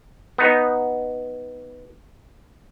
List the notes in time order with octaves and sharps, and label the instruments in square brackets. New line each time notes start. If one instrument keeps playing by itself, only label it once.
[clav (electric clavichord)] B3 D#4